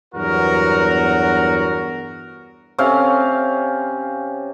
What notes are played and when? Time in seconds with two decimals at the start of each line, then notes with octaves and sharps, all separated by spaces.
0.15 E2 G2 F#3 B3 F#4 A#4
2.79 C3 C#4 F5